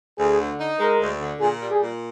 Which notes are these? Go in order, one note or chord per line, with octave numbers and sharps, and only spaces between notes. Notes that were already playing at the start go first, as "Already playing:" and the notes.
D2 G#4
D3
D#4
G#3 A#4
D2
D3
A#2 G#4
G3
G#4
A#2